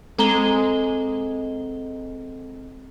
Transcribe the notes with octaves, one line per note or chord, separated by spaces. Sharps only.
G#3 C4 A4 A#5 G7